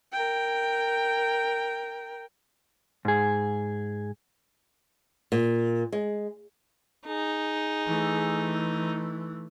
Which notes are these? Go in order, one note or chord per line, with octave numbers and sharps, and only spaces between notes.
A#4 G5
G#2 G#4
A#2
G#3
D#4 G#4
E3 A3